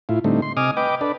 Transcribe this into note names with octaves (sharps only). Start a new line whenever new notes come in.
A2 E4 F4
A2 D3 G3 A3 C4 D#4
C6
C3 D#5 G#5 D6 D#6 F6
B4 D#5 G5 D6
D4 A4 B4 D5